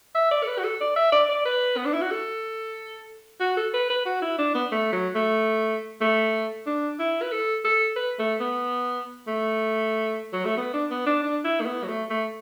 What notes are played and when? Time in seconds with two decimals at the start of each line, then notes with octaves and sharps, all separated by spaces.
0.15 E5
0.31 D5
0.44 A4
0.47 B4
0.59 F#4
0.64 A4
0.81 D5
0.96 E5
1.13 D5
1.29 D5
1.45 B4
1.77 B3
1.86 D4
1.94 E4
2.02 F#4
2.11 A4
3.41 F#4
3.57 A4
3.74 B4
3.90 B4
4.06 F#4
4.22 E4
4.39 D4
4.55 B3
4.72 A3
4.93 F#3
5.15 A3
6.01 A3
6.66 D4
6.99 E4
7.22 B4
7.32 A4
7.64 A4
7.96 B4
8.19 A3
8.40 B3
9.27 A3
10.33 F#3
10.45 A3
10.58 B3
10.74 D4
10.91 B3
11.06 D4
11.23 D4
11.45 E4
11.61 A3
11.66 B3
11.84 F#3
11.88 A3
12.10 A3